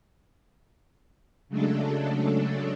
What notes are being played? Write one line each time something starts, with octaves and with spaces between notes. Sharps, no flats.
C#3 F#3 G#3 A3 D4 A4